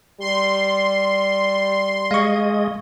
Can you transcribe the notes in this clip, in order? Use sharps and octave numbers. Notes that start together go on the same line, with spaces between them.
G3 C6
G#3 D#5 F5 C#6